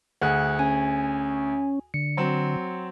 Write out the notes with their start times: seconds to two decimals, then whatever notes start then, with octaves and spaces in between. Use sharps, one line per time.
0.22 D2 G#4 F#5 F#6
0.59 C#4 G#5
1.94 D3 C#7
2.17 F#3 C4